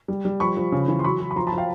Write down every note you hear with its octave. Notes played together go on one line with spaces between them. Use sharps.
G3
G3
F3 B5 C#6
F3
C#3
E3
C6
F#3 B5 C#6
F#3
B5
F3 A#5 C6
A5 B5
F3
F5 G5